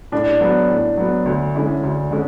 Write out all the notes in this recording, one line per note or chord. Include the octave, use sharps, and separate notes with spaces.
A2 D4
F#3 B3
A2
F#3 B3
D2
D3 G#3 C#4 E4
D2
D3 G#3 C#4